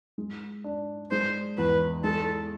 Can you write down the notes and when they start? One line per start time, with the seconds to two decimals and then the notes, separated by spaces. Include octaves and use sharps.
0.18 G#3
0.64 D4
1.11 G#3 C5
1.58 E2 B4
2.04 G#3 A4